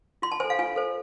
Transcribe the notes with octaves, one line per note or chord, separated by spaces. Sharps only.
F4 C6
A5
A4 C5 G#5
F5
F4 G#5
A4 C5